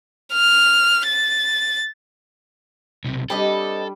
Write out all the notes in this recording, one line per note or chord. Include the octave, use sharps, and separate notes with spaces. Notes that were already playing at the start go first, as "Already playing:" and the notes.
F6
A6
B1 C3
G3 C4 D4 A4 B4 D#5